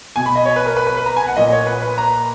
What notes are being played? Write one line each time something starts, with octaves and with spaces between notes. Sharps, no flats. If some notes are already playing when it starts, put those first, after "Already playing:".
B2 G#5
B5
D#5
C#5
B4
A#4
B4
B4
B4
A#5
G#5
F#5
A#2 D#5
C#5
B4
B4
A#5